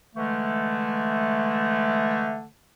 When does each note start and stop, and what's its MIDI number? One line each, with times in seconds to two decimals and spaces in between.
0.15 2.46 50
0.15 2.46 52
0.15 2.46 56
0.15 2.46 57